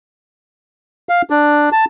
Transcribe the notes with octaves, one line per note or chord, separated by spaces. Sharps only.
F5
D4
A5